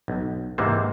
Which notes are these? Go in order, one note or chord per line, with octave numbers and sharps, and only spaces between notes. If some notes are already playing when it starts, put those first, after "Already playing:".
B1
G#2 C3 E3 A#3 C5